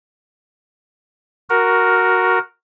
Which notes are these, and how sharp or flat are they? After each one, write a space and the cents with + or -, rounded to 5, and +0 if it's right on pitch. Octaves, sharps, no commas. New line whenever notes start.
F#4 +0 A#4 +0